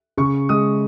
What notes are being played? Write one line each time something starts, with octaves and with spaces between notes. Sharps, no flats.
C#3 C#6
G#3 D#6